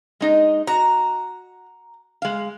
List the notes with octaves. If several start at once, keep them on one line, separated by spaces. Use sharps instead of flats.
G#3 D#4 D#5
F#4 A#5
G#3 F5